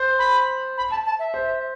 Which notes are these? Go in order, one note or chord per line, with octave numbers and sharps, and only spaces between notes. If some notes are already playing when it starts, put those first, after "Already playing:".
Already playing: C5
B5
B5
A5
A5
E5
C5